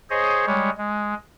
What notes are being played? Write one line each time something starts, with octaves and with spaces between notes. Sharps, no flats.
G#4 C5 C#5 D#5
G3 G#3 C#5
G#3